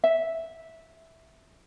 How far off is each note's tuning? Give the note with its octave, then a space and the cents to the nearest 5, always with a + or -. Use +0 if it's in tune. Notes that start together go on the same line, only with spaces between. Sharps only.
E5 -10